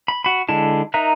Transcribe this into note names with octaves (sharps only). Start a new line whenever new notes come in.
B5
F#4 B5
D3 G#3 E4 A5
D#4 A#4 E5 A#5 F#6